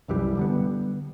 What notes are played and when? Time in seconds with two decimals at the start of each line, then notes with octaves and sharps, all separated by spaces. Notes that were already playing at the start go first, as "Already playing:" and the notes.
0.08 C2 F#2 E3 G3
0.37 D3 G3 B3